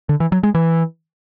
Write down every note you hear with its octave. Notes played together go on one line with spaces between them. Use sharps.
D3
E3
F#3
G#3
E3